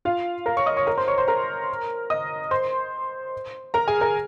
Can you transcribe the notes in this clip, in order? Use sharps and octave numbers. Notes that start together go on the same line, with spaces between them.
F4 F5
A#4 A#5
C#5 C#6
D#5 D#6
C#5 C#6
A#4 A#5
C5 C6
C#5 C#6
C5 C6
A#4 A#5
D#5 D#6
C5 C6
A#4 A#5
G#4 G#5
A#4 A#5